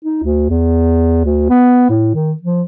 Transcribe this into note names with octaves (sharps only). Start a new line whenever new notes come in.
D#4
D2
E2
D2
B3
A2
D#3
F3